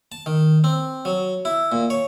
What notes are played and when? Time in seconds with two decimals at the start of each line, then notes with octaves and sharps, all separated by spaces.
0.12 A5
0.26 D#3
0.64 C4
1.05 F#3
1.45 E4
1.72 A#2
1.90 C#5